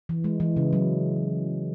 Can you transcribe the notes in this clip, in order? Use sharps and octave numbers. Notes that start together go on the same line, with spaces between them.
E3
G#3
E3
C#3
F#3